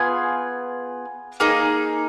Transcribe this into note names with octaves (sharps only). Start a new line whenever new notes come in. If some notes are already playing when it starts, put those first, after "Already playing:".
Already playing: B3 F4 G#4 G#5
A#3 D#4 G#4